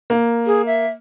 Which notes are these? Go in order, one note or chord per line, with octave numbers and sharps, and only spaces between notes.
A#3
G#4
E5